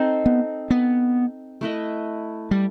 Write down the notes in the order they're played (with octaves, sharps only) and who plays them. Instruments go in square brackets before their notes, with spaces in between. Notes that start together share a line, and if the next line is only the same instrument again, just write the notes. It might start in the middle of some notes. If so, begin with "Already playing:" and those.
Already playing: [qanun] C4 D#4 A4 C5
[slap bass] B3
B3
[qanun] A3 E4 B4 D#5
[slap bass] G3